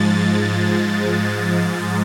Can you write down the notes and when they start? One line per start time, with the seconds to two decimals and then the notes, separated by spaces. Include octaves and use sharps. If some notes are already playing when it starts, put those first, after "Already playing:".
Already playing: G#2 F3 G#3 A6